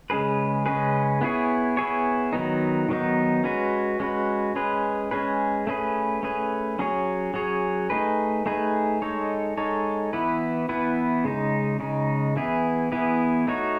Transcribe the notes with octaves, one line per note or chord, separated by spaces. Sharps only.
C#3 G#3 C#4 G#4 B4
C#3 G#3 C#4 G#4 B4
B3 E4 G#4 C#5
B3 E4 G#4 C#5
D#3 F#3 B3 D#4
D#3 F#3 B3 D#4
G#3 C#4 F#4 B4
G#3 C#4 F#4 B4
G#3 C#4 G#4 B4
G#3 C#4 G#4 B4
A3 C#4 G#4 B4
A3 C#4 G#4 B4
F#3 C#4 G#4 C#5
F#3 C#4 G#4 C#5
A3 D#4 G#4 B4
A3 D#4 G#4 B4
G#3 D#4 A4 C#5
G#3 D#4 A4 C#5
E3 B3 E4 B4
E3 B3 E4 B4
C#3 G#3 D#4
C#3 G#3 D#4
E3 B3 E4 G#4
E3 B3 E4 G#4
A3 D#4 F#4 C#5